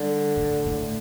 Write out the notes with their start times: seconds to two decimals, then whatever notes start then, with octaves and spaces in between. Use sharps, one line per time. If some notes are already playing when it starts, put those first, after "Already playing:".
Already playing: D3 G3
0.37 A2
0.66 A2